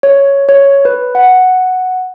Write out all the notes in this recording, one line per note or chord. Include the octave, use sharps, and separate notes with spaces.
C#5
C#5
B4
F#5